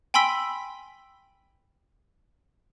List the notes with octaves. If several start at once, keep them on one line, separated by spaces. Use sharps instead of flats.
G5 G#5 B5 C6 E6 B6